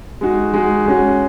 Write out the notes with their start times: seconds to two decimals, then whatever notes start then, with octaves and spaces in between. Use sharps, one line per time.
0.21 G#3 D#4 F#4
0.53 G#3 D#4 F#4
0.86 G#3 C#4 F#4